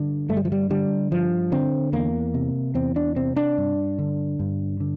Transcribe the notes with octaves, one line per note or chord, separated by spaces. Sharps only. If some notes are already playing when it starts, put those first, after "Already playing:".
Already playing: G2 D3 G3
G2 A3
G3
F3
G3
D3 G3
G2 F3
D3 C4
E2 A#3
C3
E2 C4
D4
C3 C4
D4
G2
D3
G2
D3